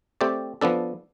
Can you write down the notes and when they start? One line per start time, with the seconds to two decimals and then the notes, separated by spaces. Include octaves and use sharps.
0.21 A3 C4 G4 D5
0.61 F3 B3 D4 A4